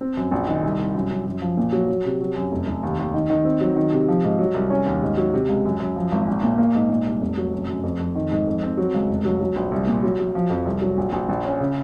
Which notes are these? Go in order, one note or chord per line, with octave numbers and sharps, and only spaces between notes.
C4
F#2
A#1
D#3
C2
C2
F#2
F#2
F#2
F3
A#2
F#3
F#3
C3
F#3
F#2
F1
F1
D#2
D#2
D#3
D#3
C4
F#3
D#3
C3
F3
G#2
F#3
C2
C#4
D#2
G#2
F#3
C3
C#2
F#2
F#2
F3
G#1
A#1
A#2
A#3
G#2
A#2
C2
F1
F#3
F#2
F#2
F2
F2
D#3
G#2
F2
C4
F#3
C#2
F1
F#3
F#3
A#1
C2
A#2
F#3
F#3
F3
F2
C2
F#3
A#1
A#1
A#1
C#4
C#3